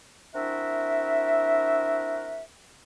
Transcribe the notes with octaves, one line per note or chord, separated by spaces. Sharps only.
C4 D4 E4 F#4 A#4 E5